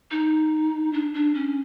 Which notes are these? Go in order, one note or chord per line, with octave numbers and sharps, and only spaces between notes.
D#4
D4
D4
C#4